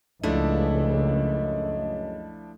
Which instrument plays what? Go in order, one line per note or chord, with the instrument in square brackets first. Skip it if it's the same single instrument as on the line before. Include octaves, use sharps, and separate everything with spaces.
[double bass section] C#2 [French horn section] F#2 C#3 D#5 [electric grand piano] F3 D4 E4 [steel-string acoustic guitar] A3